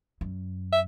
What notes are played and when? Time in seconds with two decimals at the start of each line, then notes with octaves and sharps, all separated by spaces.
0.21 F#2
0.72 E5